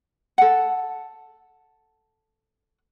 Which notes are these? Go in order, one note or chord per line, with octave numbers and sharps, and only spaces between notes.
A4 F#5